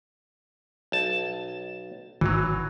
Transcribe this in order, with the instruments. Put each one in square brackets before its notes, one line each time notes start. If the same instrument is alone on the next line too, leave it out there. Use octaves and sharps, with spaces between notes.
[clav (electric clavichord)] B1 A5
[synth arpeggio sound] G#1 [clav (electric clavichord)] E3 F#3